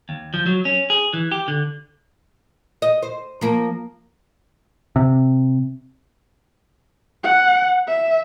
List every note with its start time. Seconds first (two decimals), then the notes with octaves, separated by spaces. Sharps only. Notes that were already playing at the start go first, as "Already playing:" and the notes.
0.09 D#2
0.34 F3
0.46 F#3
0.65 C#4
0.90 G#4
1.13 E3
1.32 G4
1.48 D3
2.82 D#5
3.02 C5
3.41 F3 A#3
4.96 C3
7.24 F#5
7.88 E5